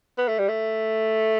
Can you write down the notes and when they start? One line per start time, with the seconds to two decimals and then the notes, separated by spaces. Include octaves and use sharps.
0.18 B3
0.28 A3
0.38 G3
0.49 A3